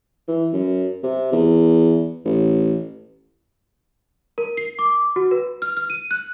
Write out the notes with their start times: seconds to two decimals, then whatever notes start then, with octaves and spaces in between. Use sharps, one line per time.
0.28 E3
0.53 F#2
1.03 C3
1.32 E2
2.25 A1
4.38 A#4
4.57 C7
4.79 D6
5.16 F#4
5.31 B4
5.62 F6
5.77 F6
5.90 D#7
6.11 F#6